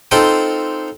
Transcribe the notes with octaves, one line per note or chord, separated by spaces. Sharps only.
C4 D#4 F4 A4 F#5 G5